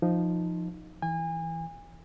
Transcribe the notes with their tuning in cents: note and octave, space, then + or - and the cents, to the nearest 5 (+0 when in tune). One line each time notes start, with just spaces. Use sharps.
F3 +0 D#4 +0
E3 +0 G#5 -35